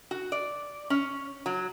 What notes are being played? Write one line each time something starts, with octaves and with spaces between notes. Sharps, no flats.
F#4
D5
C#4
F#3